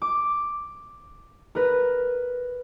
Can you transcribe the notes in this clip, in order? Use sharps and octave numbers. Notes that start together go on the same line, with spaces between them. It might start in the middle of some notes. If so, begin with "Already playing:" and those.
D6
A#4 B4